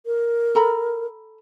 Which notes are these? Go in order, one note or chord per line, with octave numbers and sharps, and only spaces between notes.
A#4
A4 A#5 B5